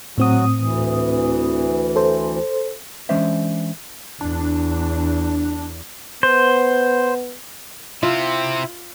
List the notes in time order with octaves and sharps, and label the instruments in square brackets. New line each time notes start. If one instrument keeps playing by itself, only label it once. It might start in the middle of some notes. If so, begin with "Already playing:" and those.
[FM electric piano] A2 C4 D#6 [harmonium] F#3 F#4
[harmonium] D2 E3
[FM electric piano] A4 C5
[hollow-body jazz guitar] E3 G#3 C#4 D4 C5 E5
[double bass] E2 [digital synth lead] D4
[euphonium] B3 [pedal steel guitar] C5
[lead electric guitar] C3 C4 [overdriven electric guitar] E4 [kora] F4